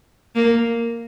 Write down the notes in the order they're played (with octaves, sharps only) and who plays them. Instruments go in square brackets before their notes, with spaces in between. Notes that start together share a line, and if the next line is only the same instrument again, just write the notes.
[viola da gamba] A#3